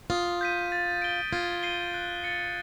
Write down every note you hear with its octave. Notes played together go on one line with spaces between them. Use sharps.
F4 D#6
G6 B6 D#7
A6
D7 G7
F4 G#6
C7 D#7 G7
F#6
A6 C#7